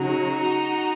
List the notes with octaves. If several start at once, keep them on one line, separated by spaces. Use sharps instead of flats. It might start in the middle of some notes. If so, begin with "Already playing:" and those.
Already playing: C#3 F#3 D#4 F#4